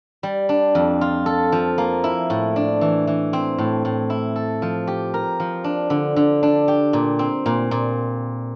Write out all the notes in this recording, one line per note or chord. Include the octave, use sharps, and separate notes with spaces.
G3
D4
F2
F4
A4
F3
A#3
E4
A2
D4
E3
E3
C4
A2
A2
E4
A4
F3
G4
A#4
F3
D4
D3
D3
D4
G4
A#2
C4
A#2
A#2